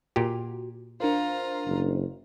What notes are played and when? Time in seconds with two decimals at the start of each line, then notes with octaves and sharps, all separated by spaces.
0.16 A#2 F#4 G4
1.00 D4 F4 A#4 C5 A#5
1.66 F#1